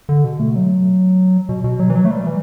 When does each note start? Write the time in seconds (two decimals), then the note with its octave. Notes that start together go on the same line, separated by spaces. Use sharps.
0.09 D3
0.24 B2
0.40 A3
0.56 F#3
1.49 B2
1.64 B2
1.80 F#3
1.90 E3
1.95 F#3
2.05 A3
2.11 G3
2.27 E3